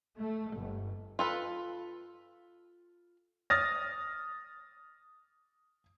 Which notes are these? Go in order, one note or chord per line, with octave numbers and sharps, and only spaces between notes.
A3
G1
F4 A4 B4
D#6 F6 A6 A#6